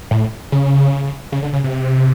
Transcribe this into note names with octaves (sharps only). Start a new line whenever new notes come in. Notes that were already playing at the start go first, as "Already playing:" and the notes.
A2
C#3
C#3
D3
C#3
C3